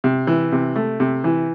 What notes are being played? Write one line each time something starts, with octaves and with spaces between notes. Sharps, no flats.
C3
E3
C3
A3
C3
E3